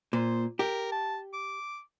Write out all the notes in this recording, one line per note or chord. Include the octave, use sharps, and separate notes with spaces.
A#2 C5
G4 A#4
A5
D6